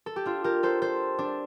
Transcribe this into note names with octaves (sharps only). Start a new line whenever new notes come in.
A4
G4
D4 F4
G4 A#4
A4 C5
A4 C5
D4